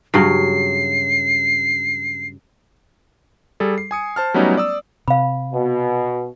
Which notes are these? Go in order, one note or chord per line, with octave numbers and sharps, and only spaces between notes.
G2 C#3 F#3 C7
G3 G#4 A4
C7
G#5 D#6 C#7
C5 A5 F6
F#3 G3 A3 B3 C#4 D#4
D5 D#6 E6
C3 F5 B5
B2